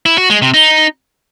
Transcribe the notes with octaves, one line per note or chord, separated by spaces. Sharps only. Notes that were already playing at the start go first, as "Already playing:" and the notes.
E4
F#4
G#3
C3
D#4